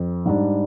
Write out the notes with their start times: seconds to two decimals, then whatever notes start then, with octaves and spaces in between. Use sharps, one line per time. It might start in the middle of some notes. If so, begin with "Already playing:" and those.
Already playing: F2
0.26 G#2 G3 D4